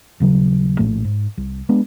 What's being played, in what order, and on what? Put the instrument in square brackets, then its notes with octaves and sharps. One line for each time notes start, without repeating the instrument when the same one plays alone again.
[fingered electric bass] D#1 C#3 F#3
A#1 A2 A3
G#2
C2
G#3 B3 D4